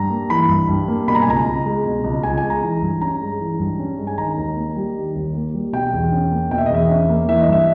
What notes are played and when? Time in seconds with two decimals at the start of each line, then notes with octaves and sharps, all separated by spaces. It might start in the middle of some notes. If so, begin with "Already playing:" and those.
Already playing: G2 A#5
0.10 A#3
0.30 E3 B5
0.49 G2
0.69 G2
0.88 A#3
1.08 B2 B5
1.15 A#5
1.22 G#5
1.27 C#2 A#5
1.46 C#2
1.66 G#3
1.86 B2
2.04 C#2
2.23 C#2 G#5
2.37 G#5
2.43 G#3
2.50 A#5
2.63 E3
2.82 G2
3.01 C#4 A#5
3.21 G#3
3.40 E3
3.59 G2
3.79 C#4
3.98 G#3
4.07 G#5
4.18 D#3 A#5
4.37 D#2
4.57 A#3
4.76 G3
4.95 D#3
5.15 D#2
5.35 A#3
5.54 G3
5.73 B2 G5
5.93 E2
6.12 C#4
6.32 A#3
6.51 B2 G5
6.58 E5
6.66 D#5
6.70 E2 E5
6.90 C#4
7.09 A#3
7.28 E3 E5
7.41 D#5
7.48 G2 E5